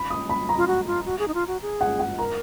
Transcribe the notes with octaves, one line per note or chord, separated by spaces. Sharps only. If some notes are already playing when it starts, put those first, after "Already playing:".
Already playing: B5
D#6
B5
A#5
F4
F#4
F4
F#4
G#4
D#4
F4
F#4
G#4
F#5
F#5
A#4 A#5